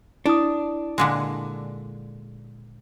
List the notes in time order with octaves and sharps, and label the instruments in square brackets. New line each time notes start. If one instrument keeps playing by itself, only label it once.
[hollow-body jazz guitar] D4 [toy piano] E4 D#6
[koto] A#2 D3 G#3